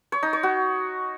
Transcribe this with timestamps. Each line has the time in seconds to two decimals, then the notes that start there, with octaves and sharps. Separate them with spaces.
0.12 C#5
0.23 D#4
0.33 C#5
0.43 F#4